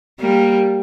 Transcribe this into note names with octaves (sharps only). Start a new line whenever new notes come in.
G3 A#3